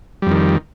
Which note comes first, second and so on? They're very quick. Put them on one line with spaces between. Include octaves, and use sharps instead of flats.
G3 F2 D#3